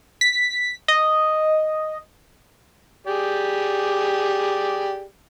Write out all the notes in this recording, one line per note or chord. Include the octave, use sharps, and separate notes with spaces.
B6
D#5
G4 G#4 D5